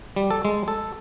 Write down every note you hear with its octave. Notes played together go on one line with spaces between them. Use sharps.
G3
A4
G#3
A4